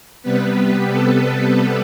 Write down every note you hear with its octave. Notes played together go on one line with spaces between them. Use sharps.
C3 G3 B3 B4
A4